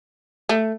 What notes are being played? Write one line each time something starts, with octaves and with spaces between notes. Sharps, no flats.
A3